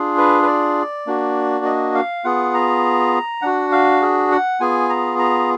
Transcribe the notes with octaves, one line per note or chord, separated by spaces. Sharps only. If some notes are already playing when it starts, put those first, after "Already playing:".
Already playing: D4 F4 G#4
B4
B4
D5
A#3 D4 F#4
D#5
F5
B3 F4 G#4 F#5
A#5
D4 F#4 F#5
F5
G#4
F#5
B3 F4 G#4 G#5
A#5
A#5